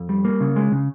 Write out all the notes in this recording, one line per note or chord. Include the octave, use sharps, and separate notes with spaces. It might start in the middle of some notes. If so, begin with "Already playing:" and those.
Already playing: F2
G3
A#3
C#3
G#3
C#3